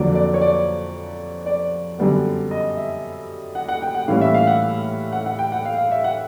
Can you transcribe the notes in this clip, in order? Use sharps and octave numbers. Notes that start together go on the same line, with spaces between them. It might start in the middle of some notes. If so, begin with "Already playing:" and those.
Already playing: F2 D3 F#3 A#3 D5
D5
C#5
D5
D5
F#2 D3 G3 B3
D#5
E5
F#5
F#5
G5
F#5
A2 E3 G3 A#3 C#4 F5
E5
F5
F#5
F#5
F#5
G5
F#5
F5
F5
E5
F#5